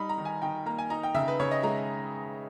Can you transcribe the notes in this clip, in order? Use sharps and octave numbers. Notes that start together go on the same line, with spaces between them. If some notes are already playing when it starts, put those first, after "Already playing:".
Already playing: G3 D#4 B5
A#5
D#3
G#5
D#3 G5
A#3 A#5
G#5
D#4 A#5
G5
C#3 E5
B4
C#3 C#5
D#5
G#3 A#5